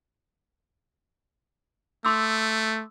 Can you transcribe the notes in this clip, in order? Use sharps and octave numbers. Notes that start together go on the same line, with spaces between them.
A3 C6 D6 E6